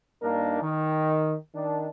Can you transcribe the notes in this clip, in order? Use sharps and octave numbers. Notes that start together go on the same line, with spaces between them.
G2 A#3 D4 D#4 A#4
D#3
D#3 D4